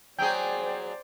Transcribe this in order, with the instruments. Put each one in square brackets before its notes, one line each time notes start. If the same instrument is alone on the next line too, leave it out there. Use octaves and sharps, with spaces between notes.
[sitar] F#3 G#4 [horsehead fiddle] C5 D5 [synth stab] G5